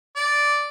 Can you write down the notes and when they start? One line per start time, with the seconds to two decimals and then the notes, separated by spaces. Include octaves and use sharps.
0.16 D5